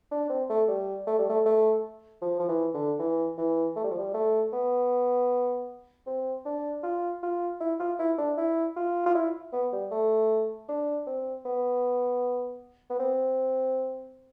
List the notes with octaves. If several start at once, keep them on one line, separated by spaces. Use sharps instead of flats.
D4
C4
A3
G3
A3
G3
A3
A3
F3
F3
E3
D3
E3
E3
A3
G3
F3
G3
A3
B3
C4
D4
F4
F4
E4
F4
E4
D4
E4
F4
F4
E4
B3
G3
A3
D4
C4
B3
B3
C4